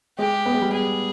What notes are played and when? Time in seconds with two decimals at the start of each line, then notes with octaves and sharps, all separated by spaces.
0.19 G#3 G4
0.46 B3
0.54 G#3
0.62 G3
0.70 G#3 G#4